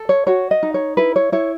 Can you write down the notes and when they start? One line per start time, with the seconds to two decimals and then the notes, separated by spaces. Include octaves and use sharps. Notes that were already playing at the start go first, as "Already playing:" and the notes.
Already playing: A4
0.09 C#5
0.27 F#4 C#5
0.51 D#5
0.63 D#4
0.74 C#5
0.97 E4 B4
1.16 C#5
1.32 E4 C#5